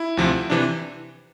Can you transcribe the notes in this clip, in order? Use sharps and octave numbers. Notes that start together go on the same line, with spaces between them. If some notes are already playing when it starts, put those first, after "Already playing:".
Already playing: E4
D2 C3 F3
C3 E3 D4